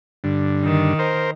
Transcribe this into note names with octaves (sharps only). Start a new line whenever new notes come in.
G2 D3
D#3
A#4 C5